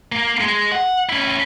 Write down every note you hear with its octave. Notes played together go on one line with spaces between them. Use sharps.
A#3
G#3
F#5
C#4 E4